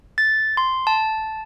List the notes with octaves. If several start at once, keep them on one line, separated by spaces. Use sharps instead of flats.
A6
C6
A5